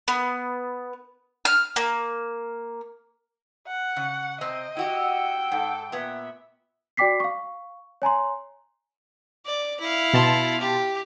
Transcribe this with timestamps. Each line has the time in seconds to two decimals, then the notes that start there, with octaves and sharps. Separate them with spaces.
0.08 B3
1.45 F6
1.76 A#3
3.67 F#5
3.96 C#3
4.41 C3 C4 D#5
4.77 E4 F#4 G4 F#5 G5 E6
5.51 G#2 A4
5.92 A#2 B3 E5
6.97 F#4 D5 G5 D6 B6 C7
7.20 F5 C#6
8.02 C#5 G#5 A#5 C6
9.46 D5
9.80 E4 F5
10.13 B2 A5 C6
10.61 G4